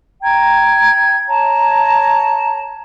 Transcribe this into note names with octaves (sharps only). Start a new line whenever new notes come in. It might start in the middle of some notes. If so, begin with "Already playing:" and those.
G5 A#5 G#6
C#5 A5 A#5